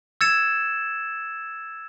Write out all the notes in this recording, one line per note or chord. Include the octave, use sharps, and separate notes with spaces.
E6 G#6 A6 C#7 E7